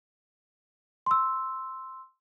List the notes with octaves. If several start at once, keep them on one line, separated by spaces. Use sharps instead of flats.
C6 E6